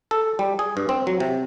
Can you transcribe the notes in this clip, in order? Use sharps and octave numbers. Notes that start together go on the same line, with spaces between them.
A4
G3
G#4
G2
C4
F#3
C3